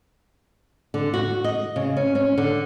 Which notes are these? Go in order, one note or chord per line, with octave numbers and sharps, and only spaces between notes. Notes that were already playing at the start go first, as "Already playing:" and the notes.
D3
F#4
D#5
C#3
C#4
C#4
D3